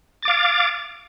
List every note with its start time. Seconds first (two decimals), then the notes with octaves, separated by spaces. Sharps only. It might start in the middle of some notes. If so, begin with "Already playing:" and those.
0.22 A6
0.25 D6
0.28 F5